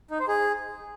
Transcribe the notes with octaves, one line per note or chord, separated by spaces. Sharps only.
D#4
C5
G#4